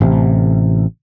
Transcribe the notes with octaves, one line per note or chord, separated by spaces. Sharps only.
A1 C3